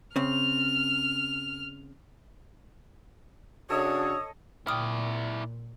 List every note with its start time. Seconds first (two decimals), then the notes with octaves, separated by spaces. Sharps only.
0.16 C#3 C4 F6
3.70 C#3 D4 F#4 A4 C#5 D#5 D#6
4.67 A#2 E4 D5 G5 D#6 F6